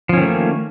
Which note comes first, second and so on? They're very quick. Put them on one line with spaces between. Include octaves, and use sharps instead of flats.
F3 C#4 D#3 A3 A#3